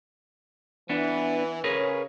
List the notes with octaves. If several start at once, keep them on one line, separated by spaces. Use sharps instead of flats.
E3 B3 D4
C#3 G#4 A#4 B4 C#5